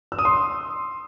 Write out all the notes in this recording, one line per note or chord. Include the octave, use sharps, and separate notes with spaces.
E6
D#6
C6